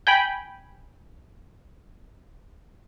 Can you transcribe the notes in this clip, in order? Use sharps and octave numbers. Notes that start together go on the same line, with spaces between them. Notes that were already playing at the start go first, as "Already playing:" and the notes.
G5 G#5 B5